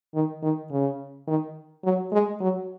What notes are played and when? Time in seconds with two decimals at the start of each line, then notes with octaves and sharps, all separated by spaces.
0.14 D#3
0.42 D#3
0.71 C#3
1.27 D#3
1.84 F#3
2.12 G#3
2.41 F#3